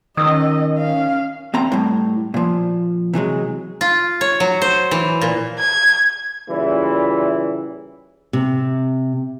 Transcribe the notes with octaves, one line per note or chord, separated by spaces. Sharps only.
D#3 C#4 D#5 D#6 E6
C#4 F5
E2 C4 A#5
A2 G3
A#2 F3
C3 E3 F#3 G#3
F4
C#5
F#3
C5
E3
A#2
G#6
A#2 C#3 E3 G3 E4
C3